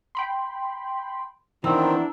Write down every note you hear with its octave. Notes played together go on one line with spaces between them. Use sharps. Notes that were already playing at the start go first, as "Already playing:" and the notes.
G5 B5 C6
D#3 E3 B3 C4 D4 E4 A#5 E6